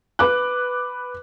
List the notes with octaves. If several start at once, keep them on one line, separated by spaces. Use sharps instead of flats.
B4 D6 F#6